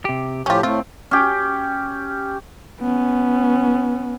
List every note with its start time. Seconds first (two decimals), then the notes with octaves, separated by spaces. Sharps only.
0.05 C3 G4
0.46 A2 F3 C#4 F4 G4
0.63 A2 A3 C4 F4
1.11 C#4 G4
2.81 B3 C#4